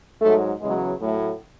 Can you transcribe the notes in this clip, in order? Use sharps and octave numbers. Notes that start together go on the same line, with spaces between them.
G#2 F#3 A3
E2 C#3 F#3 G#3
A2 F#3 A3